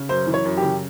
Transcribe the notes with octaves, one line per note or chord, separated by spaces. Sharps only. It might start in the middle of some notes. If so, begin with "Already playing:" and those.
Already playing: C#3
F#2 C5
E3
C#5
F#2
G4
C#3